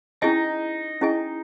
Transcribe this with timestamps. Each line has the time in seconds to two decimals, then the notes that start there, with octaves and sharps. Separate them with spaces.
0.22 C#4 D#4 E4 G#4 D#5 G#5
1.01 C#4 E4 G#4 D#5 G#5